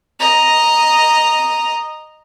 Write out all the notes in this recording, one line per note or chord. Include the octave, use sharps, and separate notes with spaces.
D#5 A#5